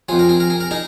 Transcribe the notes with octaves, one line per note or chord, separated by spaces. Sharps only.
F2 F3 G#4
A#4
G#4
A#4
G#4
A#4
D#4 G#4